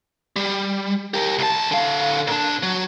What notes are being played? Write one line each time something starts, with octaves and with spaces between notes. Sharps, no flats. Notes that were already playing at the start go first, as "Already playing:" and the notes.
G3
G4 A#4
C2 A5
D3 F5
A#2 D4
F#3